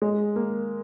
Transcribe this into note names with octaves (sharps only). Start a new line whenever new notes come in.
G#3
A#3